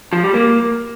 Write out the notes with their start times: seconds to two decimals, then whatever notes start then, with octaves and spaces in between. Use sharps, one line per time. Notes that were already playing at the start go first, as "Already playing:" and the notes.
0.13 F3
0.23 G3
0.34 A#3